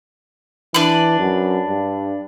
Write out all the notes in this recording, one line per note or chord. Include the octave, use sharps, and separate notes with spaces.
E3 D4 B4
F#2
G2